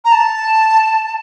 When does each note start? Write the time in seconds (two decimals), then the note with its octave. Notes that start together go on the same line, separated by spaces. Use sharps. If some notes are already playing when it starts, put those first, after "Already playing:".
0.05 A#5
0.12 A5